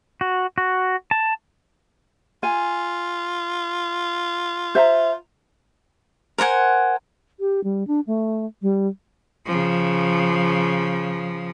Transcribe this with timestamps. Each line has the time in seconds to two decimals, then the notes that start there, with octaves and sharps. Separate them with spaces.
0.21 F#4
0.58 F#4
1.11 A5
2.43 F4 G#5
4.75 C5 E5 A#5
6.38 A#4 C5 F#5 G#5
7.40 G4
7.64 G3
7.87 D4
8.07 A3
8.62 G3
9.46 C#3 F3